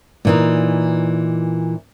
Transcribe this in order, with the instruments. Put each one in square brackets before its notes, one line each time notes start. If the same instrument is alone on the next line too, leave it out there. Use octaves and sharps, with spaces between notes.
[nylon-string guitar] A#2 E3 D#4